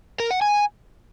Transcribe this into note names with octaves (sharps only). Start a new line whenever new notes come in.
A#4
F#5
G#5